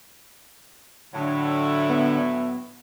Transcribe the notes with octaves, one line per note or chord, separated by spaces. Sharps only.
A2 D3 F#3 E4
B3